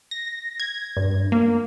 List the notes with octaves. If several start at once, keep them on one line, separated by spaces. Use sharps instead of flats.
A#6
G#6
G2
A#3